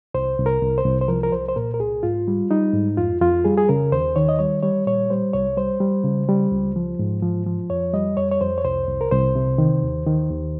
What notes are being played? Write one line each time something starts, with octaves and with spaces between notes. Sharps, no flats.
C2 C5
C2
A#4
C2
C5
C2
C5
F3 A#4
A#4
C2 C5
C5
A#2 A#4
A#4
C2 G#4
G#2 F4
G3
G3 D#4
G#2
F2 F4
F2 F4
G3 G#4
G#4
C#3 A#4
D#2 C5
D#3 C#5
D#5
G3 C#5
G3 C#5
A#2 C#5
G3 C5
C2 C#5
G3 C5
G3
C#3
G3
C#2
F3
G#2
F3
F3
F2 C#5
G3 D#5
F2 C#5
C#5
F2 C5
C#5
C2 C5
C2
A#4
C2 C5
C3
D#3
D#2
D#3
D#2